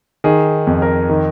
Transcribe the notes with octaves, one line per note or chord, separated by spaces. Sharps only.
D#3 G#4
F2
A#4
D#3